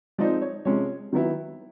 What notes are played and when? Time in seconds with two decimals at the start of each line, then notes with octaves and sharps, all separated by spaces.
0.18 F3 G#3 C4 D#4 D5
0.41 C#5
0.65 C3 F3 G#3 C#4 C#5
1.13 D#3 F#3 B3 E4